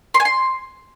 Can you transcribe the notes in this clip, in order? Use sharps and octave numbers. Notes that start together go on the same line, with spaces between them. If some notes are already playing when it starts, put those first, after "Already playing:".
C6
G#5
C6